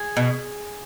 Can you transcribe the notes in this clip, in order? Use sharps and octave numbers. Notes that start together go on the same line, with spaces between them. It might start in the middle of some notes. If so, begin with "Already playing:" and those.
Already playing: G#4
B2